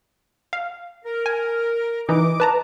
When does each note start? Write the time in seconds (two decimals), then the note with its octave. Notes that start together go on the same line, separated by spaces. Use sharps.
0.53 F5
1.05 A#4
1.26 G#5
2.09 E3 D#4 D#5 D6
2.40 B4 A5 A#5